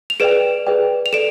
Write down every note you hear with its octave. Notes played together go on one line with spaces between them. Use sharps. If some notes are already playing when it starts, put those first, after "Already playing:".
F7
G#4 B4 D5 G5 D7 E7
G#4 B4 D5 G5
F7
A4 D5 D7 E7